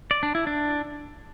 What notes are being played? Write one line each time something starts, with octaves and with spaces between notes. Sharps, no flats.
D5
D4
E4
D4